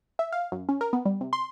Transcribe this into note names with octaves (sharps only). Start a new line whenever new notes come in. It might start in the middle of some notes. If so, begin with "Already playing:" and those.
E5
F5
F#2
C#4
A#4
B3
G3
C3
C6